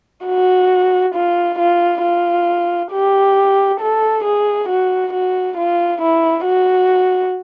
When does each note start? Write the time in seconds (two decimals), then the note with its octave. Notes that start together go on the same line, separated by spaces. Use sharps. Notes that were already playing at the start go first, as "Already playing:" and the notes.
0.26 F#4
1.15 F4
1.59 F4
2.03 F4
2.92 G4
3.80 A4
4.24 G#4
4.69 F#4
5.13 F#4
5.58 F4
6.02 E4
6.46 F#4